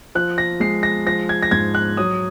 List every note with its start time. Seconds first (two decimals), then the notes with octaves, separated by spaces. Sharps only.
0.15 F3 F#6
0.38 A#6
0.60 G#3 C7
0.83 A#6
1.06 F3 A#6
1.29 G#6
1.43 A#6
1.51 G#2 G#6
1.75 F#6
1.97 F#3 D#6